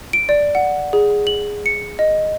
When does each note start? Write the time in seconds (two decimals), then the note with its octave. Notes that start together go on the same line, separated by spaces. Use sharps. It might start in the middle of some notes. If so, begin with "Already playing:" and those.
0.13 D7
0.29 D5
0.55 F#5
0.93 G#4
1.27 F#7
1.66 C#7
1.99 D#5